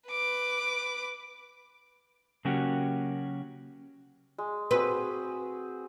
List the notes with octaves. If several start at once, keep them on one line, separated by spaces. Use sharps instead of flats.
B4 D6
C#3 F#3 A#3 C#4 F#4 G4
G#3
C4 F#4 G#4 B4